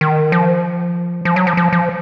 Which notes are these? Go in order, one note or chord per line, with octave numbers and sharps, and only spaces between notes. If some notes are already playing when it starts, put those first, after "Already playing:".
D#3
F3
F3
F#3
F3
F3
F3